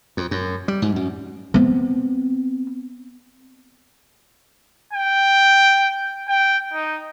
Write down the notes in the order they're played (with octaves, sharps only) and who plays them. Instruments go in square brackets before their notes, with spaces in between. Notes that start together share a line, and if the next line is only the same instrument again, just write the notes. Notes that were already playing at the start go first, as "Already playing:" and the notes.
[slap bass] F2
F#2
G3
G#2
F#2
[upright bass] B3 C4
[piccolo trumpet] G5
G5
D#4